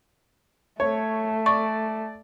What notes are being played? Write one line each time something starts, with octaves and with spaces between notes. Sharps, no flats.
A3 C#5
D5 C#6